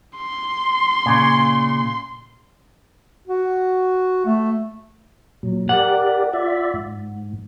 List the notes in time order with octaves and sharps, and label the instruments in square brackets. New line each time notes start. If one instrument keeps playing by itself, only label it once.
[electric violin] C6
[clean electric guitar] A#2 C#3
[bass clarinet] F#4
A3
[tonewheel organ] A#2 F#3
[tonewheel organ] G4 A#4 D5 [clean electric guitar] F#5
[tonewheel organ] F4 D5 E5
G#2